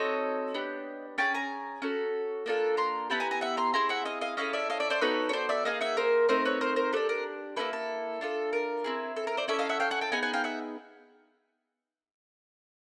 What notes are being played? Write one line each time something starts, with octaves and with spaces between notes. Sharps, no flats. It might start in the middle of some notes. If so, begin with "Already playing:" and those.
Already playing: C4 D#4 F#4 A4 C#5 D#5
B3 D4 G4
C#4 F4 G#4 G5 A5
G#5 A#5
C#4 F#4 A4
A#3 D4 F4 A4
A#5 C6
B3 E4 G4 A5 B5
G#5 A#5
G#5 A#5
E5 F#5
A#5 C6
C4 E4 G#4 A#5 C6
E5 F#5
D#5 F5
D#5 F5
C#4 E4 A4 D#5 F5
D5 E5
D#5 F5
D5 E5
C5 D5
B3 D#4 F#4 A4 B4 C#5
C#5
C5 D5
D5 E5
A#3 D#4 G#4 D#5 F5
E5 F#5
A#4 C5
A3 C4 D#4 A#4 C5
B4 C#5
A#4 C5
A#4 C5
D4 G4 A4 B4
A#4
A#3 C#4 E4 A4 B4
A4
D4 F4 A4
A#4
C4 E4 G#4
A4
A#4
C5 D5
C#4 E4 A4 D5 E5
D#5 F5
E5 F#5
F5 G5
F#5 G#5
G5 A5
B3 D#4 G#4 F#5 G#5
F#5 G#5
F5 G5
E5 F#5